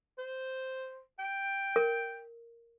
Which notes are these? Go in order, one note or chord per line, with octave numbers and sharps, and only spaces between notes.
C5
G5
A#4